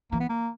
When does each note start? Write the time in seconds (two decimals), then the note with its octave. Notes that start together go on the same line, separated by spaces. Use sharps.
0.12 E3 A#3
0.20 B3
0.29 A#3